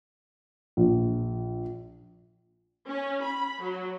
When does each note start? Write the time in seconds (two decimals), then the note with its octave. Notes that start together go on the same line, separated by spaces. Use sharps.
0.77 A#1
2.88 C#4
3.24 B5
3.62 F#3